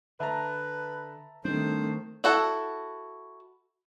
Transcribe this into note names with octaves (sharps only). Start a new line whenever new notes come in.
D3 B4 E5 A5 A#5
D#3 G3 A3 C4 D4 C5
E4 F#4 A4